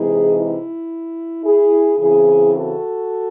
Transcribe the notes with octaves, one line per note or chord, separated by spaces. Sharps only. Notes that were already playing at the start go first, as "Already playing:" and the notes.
Already playing: C3 E3 G#3 D#4 E4 G#4
E4
E4 G#4
C#3 E3 C4 E4 G#4
F#4 A4